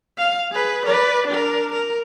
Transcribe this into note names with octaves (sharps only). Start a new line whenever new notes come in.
F5
G#4 B4
B4 D5
D4 A#4
A#4